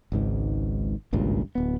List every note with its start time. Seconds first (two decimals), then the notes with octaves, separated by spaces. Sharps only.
0.12 G#1 C#2 G#2
1.13 G#1 C#2 G2 A#2
1.55 D1 B3